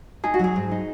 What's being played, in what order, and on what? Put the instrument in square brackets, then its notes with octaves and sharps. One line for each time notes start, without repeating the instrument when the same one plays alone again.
[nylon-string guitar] D#4 [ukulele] G#4
[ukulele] F#4
[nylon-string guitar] F#3 [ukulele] G#4
[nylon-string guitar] G#2
D#4